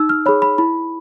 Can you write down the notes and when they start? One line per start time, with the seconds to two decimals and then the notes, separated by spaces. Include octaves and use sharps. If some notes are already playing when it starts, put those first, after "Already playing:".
Already playing: D#4 E6
0.09 F6
0.26 G#4 C#5 B5
0.42 B5
0.58 E4 B5